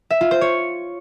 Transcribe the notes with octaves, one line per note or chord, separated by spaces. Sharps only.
E5
F4
C5
C#5